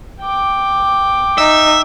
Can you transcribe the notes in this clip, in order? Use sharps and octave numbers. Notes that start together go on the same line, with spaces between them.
G5 D6
D#4 E5